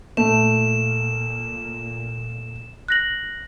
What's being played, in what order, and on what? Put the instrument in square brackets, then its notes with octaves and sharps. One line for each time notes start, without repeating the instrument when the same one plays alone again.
[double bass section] A#2 [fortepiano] A3 [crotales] E7
[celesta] F#6 A#6 F#7